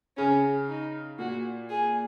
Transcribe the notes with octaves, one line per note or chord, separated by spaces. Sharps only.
C#3 C#4
D#4
A#2 F#4
G#4